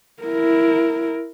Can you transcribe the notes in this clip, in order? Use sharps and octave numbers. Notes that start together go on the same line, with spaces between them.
E4 A#4